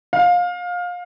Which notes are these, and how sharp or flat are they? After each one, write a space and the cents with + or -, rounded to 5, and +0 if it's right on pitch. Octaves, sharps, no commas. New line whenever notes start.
F5 +25